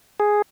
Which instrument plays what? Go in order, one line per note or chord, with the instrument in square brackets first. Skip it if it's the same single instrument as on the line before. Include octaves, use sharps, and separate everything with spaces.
[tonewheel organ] G#4